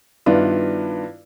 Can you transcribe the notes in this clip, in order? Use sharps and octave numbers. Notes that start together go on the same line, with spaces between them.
G2 D#3 B3 D4 E4 F4